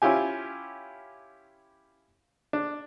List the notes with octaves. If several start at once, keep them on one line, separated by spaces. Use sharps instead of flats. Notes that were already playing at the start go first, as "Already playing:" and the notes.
C#4 E4 F4 G4 G#5
D4